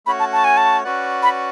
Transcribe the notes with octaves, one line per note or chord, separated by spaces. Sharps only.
A3 C#4 F#4 C#5 F#5 B5
A5
A5
G#5
A5
C#4 F#4 B4 D5 F#5
B5